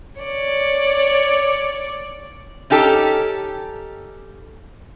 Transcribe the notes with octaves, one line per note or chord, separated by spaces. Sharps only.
C#5 D5
C#4 D#4 G4 A4